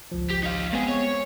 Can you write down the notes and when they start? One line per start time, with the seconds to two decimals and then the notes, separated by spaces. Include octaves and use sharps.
0.12 G#1 C#2 F3
0.30 G4
0.44 D#4 F5
0.73 A#2 G#3 B3 C4 G#4
0.88 C#5